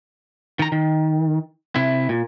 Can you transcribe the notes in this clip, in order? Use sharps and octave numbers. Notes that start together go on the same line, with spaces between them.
D#3 A#5
D#3
C3 E4
A#2